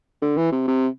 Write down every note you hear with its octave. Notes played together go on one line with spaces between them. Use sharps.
D3
E3
C3
C3